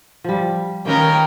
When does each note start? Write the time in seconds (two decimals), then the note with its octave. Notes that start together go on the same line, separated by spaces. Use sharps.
0.24 F3 G3
0.86 D#3 A#3 C#4 D#4 A#4 B4 G5